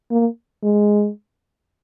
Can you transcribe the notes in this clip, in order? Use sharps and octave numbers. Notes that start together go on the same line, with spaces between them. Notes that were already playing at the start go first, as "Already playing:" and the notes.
A#3
G#3